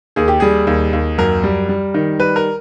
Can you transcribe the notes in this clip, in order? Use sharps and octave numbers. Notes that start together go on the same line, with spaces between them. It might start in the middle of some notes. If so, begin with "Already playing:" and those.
D#2 G#4
G4
G3 G#4
D#2
D#2
F#2 A#4
G3
G3
D#3
G3 B4
A#4